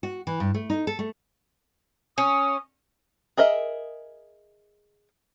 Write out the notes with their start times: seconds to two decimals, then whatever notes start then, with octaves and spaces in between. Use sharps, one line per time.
0.03 F#4
0.27 E3
0.40 G2
0.54 A3
0.70 D#4
0.87 A4
0.99 A3
2.18 C#4 D#6
3.37 G#4 A#4 D#5 E5